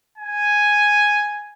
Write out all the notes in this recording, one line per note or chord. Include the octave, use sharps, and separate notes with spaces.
G#5